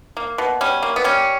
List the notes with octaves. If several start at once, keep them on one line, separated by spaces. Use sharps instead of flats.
A#3
B2
G3 C#4
A#3
B3
G3 C#4